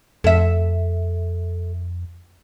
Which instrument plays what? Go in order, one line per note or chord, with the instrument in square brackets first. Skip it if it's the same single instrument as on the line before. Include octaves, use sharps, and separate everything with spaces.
[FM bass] F2 [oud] A4 E5